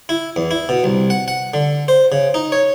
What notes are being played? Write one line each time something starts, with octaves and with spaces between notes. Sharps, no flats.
E4
E2
E4
B2
C2
F#5
F#5
D3
C5
C#3
D#4
C#5